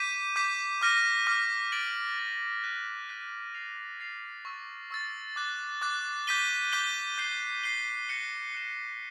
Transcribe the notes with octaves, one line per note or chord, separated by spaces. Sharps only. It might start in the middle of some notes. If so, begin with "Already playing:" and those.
Already playing: D6 G6 B6 D#7
D6 G6 B6 D#7
D6 F6 A#6 D#7
D6 F6 A#6 D#7
A6 D7 F#7
A6 D7 F#7
F#6 B6 D#7 F#7
F#6 B6 D#7 F#7
A6 C7 F7
A6 C7 F7
C#6 E6 A6
C#6 E6 A6
D6 F#6 A6
D6 F#6 A6
D6 G6 B6 D#7 G7
D6 G6 B6 D#7 G7
G6 C7 D#7 G7
G6 C7 D#7 G7
F#6 A#6 C#7 E7 G7
F#6 A#6 C#7 E7 G7